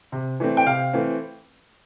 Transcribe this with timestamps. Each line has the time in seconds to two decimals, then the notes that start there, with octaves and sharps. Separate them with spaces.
0.12 C3
0.40 E3 A3 C4
0.57 G5
0.66 C3 F5
0.93 E3 A3 C4